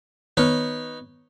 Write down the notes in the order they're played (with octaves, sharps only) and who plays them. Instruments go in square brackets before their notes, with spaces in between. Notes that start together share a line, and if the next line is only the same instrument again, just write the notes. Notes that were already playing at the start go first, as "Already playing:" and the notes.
[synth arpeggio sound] D#3 B3 [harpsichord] D#4 B4 C#5